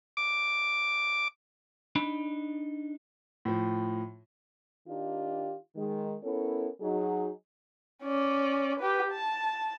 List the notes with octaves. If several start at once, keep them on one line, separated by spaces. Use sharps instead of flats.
D6
D4 D#4 B5
A2 F3
D#3 D4 D#4 F4 G4
D#3 G#3
B3 C#4 E4 A4 A#4 C#5
F#3 D#4 G#4
C#4 D5
G4 B4
A5